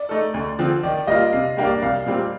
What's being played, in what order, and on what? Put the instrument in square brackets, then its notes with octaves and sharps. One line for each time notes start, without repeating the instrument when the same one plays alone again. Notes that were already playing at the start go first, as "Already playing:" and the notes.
Already playing: [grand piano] D5
[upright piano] A3 D#4 A4
D2
D3 F3 C4
[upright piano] D#3 [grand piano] D5
[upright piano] G3 A#3 F4 [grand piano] D#5
[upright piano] C3 [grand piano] F5
[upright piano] G3 A#3 D4 G4
[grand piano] D5
[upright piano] C2 [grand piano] F5
[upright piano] A#2 G3 C4